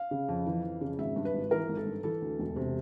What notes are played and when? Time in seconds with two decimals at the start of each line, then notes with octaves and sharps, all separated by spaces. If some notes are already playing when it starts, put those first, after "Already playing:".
Already playing: F5
0.11 C#3
0.29 F2
0.46 E3
0.63 F2
0.81 C#3
0.99 G#1 E5
1.16 G2
1.25 B4
1.34 G#1
1.51 E3 A#4
1.69 G#1
1.77 A4
1.86 G2
2.04 E3 A4
2.22 D2
2.39 E1
2.56 C3